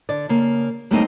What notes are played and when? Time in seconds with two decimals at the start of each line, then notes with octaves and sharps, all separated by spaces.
0.09 D3 D5
0.29 C#3 A#3
0.91 F#3 G3 A3 A#3 C4 D#4